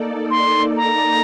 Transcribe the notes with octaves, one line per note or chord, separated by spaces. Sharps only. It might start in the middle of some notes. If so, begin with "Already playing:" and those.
Already playing: A#3 D#4 A4 D5
C6
A#5